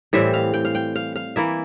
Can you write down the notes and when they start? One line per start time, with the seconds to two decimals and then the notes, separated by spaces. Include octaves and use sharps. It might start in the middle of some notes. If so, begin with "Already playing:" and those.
0.13 A2 E3 G3 C4 E5
0.34 F5
0.54 G5
0.65 F5
0.75 G5
0.96 F5
1.16 F5
1.36 E3 A#3 E4 E5